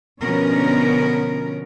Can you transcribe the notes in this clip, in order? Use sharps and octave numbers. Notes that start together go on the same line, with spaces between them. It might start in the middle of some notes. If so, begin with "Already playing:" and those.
B2 D3 F3 B3 C#4 A#4